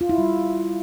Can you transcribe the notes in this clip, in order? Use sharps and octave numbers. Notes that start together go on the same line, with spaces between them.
F4
E4
G3